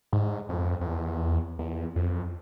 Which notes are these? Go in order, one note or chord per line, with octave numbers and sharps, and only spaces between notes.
G#2
F2
F2
E2
E2
F2